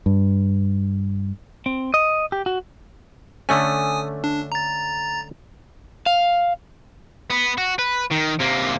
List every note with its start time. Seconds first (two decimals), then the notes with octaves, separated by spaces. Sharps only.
0.06 G2
1.66 C4
1.94 D#5
2.32 G4
2.46 F#4
3.49 D3 A3 C#4 G#5 D#6
4.24 D4
4.52 A#5 A6
6.06 F5
7.30 B3
7.58 F#4
7.79 B4
8.11 D#3
8.39 C3 A#3